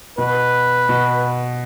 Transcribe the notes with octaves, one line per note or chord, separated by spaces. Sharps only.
B2 B4
B2